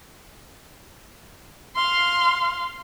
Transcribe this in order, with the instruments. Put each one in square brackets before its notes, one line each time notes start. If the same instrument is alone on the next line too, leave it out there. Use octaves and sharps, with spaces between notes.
[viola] F5 C6